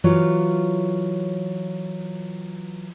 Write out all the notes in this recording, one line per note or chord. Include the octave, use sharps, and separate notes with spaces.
E3 F#3 F4 C#5